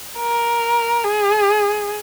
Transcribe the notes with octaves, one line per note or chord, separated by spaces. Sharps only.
A#4
G#4